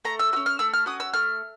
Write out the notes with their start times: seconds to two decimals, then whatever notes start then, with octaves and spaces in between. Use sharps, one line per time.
0.05 A3 A#5
0.19 E6
0.33 C#4 F#4 E6
0.46 F6
0.59 A3 E6
0.74 F6
0.86 C#4 F#4 D#6
1.00 E6
1.14 A3 F6